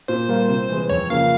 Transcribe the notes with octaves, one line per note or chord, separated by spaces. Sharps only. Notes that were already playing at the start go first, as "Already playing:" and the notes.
A#2 C5
G3 A#3 F4 A#4
C3
E3 G#3
F2 C#5
C#3 F3 A#3 F5